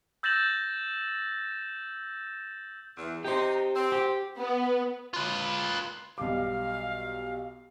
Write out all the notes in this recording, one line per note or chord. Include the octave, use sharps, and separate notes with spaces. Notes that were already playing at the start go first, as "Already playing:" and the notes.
E6 G6 A6 A#6 E7 F#7
E2
D#4 G4 C5
C4
G4
B3
F4 B4
B1 G3 F5 D6